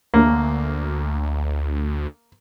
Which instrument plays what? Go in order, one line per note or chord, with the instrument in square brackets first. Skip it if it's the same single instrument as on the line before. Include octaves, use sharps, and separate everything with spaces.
[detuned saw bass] D2 [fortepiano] A#3